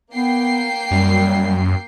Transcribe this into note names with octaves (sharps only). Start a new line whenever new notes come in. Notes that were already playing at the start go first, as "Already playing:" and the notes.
A#3 B3 G5 C7
F#2 G3